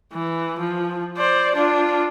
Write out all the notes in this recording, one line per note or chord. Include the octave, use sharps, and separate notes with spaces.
E3
F3
C5 D5
D4 F4